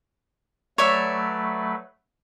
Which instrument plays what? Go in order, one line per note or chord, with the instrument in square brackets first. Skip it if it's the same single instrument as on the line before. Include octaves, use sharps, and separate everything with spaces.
[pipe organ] F#3 A3 B4 [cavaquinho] C#5 D5 E5